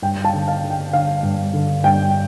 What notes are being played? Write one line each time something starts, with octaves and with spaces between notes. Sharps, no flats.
G2 G5
F5 A5
D3
F5 A5
D3
G5
D3 F5
G2
D3
G2 G5